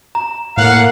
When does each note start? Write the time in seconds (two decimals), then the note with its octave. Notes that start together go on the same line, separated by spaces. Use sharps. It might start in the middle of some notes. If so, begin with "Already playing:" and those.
0.15 A#5
0.57 A2 A#3 F5 F#5